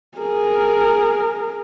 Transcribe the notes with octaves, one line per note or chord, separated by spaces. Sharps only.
G#4 A#4